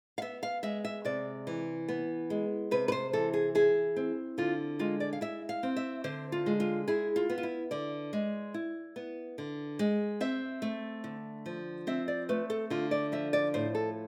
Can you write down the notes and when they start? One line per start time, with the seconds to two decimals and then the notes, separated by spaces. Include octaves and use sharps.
0.18 F5
0.22 B3 E5
0.43 F5
0.63 G#3 E5
0.85 E5
1.05 C3 D5
1.47 E3
1.89 B3
2.30 G#3
2.71 C3 B4
2.88 B4
2.92 C5
3.13 E3 A4
3.34 G#4
3.55 E4 G#4
3.96 C4
4.38 D3 F4
4.79 G#3 F4
5.00 D5
5.13 F5
5.21 E4 E5
5.49 F5
5.63 C4
5.77 E5
6.04 D3 C5
6.32 F4
6.46 G#3
6.60 F4
6.88 E4 G#4
7.16 F4
7.30 B3
7.38 F4
7.43 E4
7.71 D3 D5
8.13 G#3
8.54 E4
8.96 B3
9.38 D3
9.79 G#3
10.21 C4 E5
10.62 A3
11.04 D3
11.46 F3
11.87 C4 E5
12.08 D5
12.29 A3 B4
12.50 A4
12.70 D3 F4
12.91 D5
13.12 F3 E5
13.33 D5
13.54 A2 C5
13.75 A4